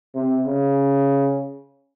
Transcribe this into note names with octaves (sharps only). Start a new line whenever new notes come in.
C3
C#3